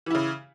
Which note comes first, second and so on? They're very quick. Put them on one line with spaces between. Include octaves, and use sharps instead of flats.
E3 E4 C#3